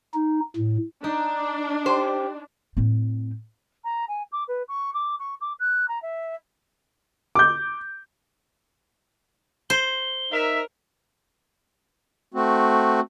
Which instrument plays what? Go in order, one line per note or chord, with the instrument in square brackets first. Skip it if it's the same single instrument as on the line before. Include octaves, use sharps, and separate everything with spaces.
[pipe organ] D#4
A2
[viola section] D4 [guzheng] D#4
[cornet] G4 [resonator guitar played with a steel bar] C5
[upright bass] A2 C4
[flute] A#5
G#5
D6
B4
C#6
D6
C#6
D6
F#6
A#5
E5
[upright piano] D6 G6
[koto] C5 [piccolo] G7
[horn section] D#4 E5 [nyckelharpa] A#4
[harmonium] A3 C4 F#4